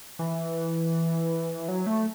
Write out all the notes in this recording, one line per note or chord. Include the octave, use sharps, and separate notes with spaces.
E3
F#3
A3